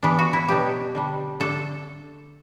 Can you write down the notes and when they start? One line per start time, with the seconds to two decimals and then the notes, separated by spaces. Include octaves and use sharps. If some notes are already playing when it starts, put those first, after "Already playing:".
0.03 E3 B3 D4
0.19 F#4
0.33 E4
0.48 B2 F#3 B3 D4 G4
0.95 D3 G3 D4
1.40 D3 A3 D4 A4